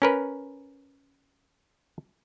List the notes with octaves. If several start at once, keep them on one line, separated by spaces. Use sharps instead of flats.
C#4 A#4 B4